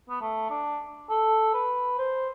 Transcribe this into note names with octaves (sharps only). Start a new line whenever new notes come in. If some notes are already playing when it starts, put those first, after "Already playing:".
B3
A3
D4
A4
B4
C5